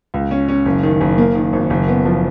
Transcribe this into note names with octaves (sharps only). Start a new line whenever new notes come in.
C#2
C#4
C#4
F#1
D#3
F#1
A#3
D#3
G#1
F#1
B3
F3